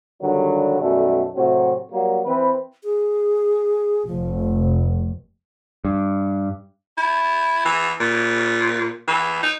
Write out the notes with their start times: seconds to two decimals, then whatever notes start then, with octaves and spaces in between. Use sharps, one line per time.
0.22 G2 D3 D#3 F#3 G3
0.81 B1 F#2 G3 A3 A4
1.35 A2 C3 F#3 C4 F#4
1.92 F#3 G3 A#3
2.25 E3 C4 B4
2.84 G#4
4.07 F1 F3
5.85 G2
6.97 E4
7.65 E3
8.00 A#2
9.08 E3
9.43 D#4